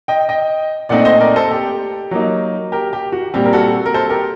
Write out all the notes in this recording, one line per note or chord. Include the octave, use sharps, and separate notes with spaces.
D#5 G5
D#5 G5
A#2 A3 C4 D#4 D5 F#5
C5 D#5
A#4 D5
A4 C5
G4
F#3 A#3 D#4
G4 A#4
G4
F#4
A#2 G3 C4 G4
A#4
F#4 A4
A#4
A4 C5
G4 A#4